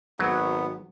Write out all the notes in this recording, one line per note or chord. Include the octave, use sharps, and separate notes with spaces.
G#1 F#3 B3